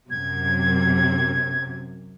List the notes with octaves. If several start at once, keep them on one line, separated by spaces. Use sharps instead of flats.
F#2 C3 G#6